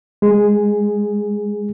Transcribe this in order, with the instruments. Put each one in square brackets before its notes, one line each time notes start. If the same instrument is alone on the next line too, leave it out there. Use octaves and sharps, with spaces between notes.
[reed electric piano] G#3 G#4